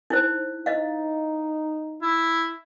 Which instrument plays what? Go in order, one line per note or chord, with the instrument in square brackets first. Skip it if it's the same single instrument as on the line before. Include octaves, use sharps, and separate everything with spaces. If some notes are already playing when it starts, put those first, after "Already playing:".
[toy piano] D#4 E4 C5
[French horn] D#4 [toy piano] D#5 F5
[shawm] E4